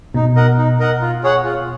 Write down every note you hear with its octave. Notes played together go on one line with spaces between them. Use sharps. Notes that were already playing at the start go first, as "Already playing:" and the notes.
B2 D#4
A#4 D#5 F#5
D#4
A#4 D#5 F#5
F4
G#4 C#5 F#5
F4